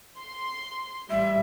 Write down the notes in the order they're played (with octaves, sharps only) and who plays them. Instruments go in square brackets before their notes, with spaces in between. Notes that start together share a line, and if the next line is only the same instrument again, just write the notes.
[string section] C6
[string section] A1 G3 [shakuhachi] E5